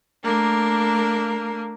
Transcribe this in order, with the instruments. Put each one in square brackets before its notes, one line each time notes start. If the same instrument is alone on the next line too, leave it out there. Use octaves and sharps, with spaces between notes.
[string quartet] A3 A#3 D4 A#4